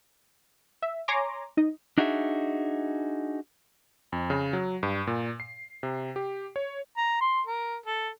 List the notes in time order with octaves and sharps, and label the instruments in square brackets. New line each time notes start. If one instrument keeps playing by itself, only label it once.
[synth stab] E5
C#5 G#5 A#5 C6 D6
D#4 D#5
[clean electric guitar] D4 D#4 F#4 G#4 E5
[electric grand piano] F2
C#3
F#3
G2
A#2
C7
C3
G4
C#5
[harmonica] A#5
C6
A#4
A4